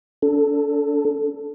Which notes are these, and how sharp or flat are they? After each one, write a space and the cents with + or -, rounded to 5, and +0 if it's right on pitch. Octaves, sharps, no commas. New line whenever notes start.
D4 -35 A4 +0